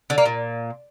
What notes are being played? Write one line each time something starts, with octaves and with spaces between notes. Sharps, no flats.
D3
A#3
A#2